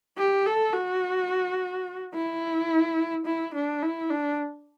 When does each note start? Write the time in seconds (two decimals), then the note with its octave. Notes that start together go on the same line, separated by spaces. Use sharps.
0.17 G4
0.46 A4
0.74 F#4
2.14 E4
3.26 E4
3.54 D4
3.82 E4
4.10 D4